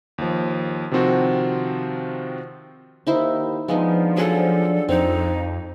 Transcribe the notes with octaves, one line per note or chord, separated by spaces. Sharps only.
D#2 F3
C3 D#3 F3 C4 F#4
D#2 D#4 E4 C5
F3 G#3 B3 D4 D#4
F#3 G#4 A4 F#5
F2 C4 D#4